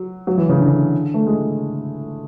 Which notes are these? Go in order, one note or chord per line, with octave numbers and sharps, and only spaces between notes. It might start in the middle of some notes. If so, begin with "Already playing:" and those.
Already playing: F#3
F#3
E3
C#3
D3
A3
G#3